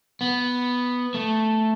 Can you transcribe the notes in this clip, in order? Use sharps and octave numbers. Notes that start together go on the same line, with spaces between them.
B3
A3